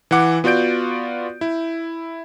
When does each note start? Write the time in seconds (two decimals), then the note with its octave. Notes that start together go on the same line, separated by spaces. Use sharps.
0.11 E3 E4 F#5 D6
0.44 B3 F4 F#4 D5 G6 D7
1.41 E4